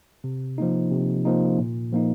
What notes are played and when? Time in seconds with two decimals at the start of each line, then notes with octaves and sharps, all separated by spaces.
0.24 C3
0.58 F3 A#3 D#4
0.91 C3
1.25 F3 A#3 D#4
1.59 A#2
1.93 F3 A#3 D#4